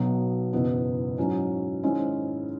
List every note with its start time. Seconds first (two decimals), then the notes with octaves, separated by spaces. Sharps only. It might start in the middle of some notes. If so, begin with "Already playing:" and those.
Already playing: B1 B2 F#3 B3
0.53 F#1 E2 B2 B3 E4
1.18 G#2 F#3 C#4 E4
1.83 G#1 G#2 G#3 C#4 E4